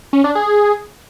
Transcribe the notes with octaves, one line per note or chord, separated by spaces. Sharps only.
C#4
D4
G#4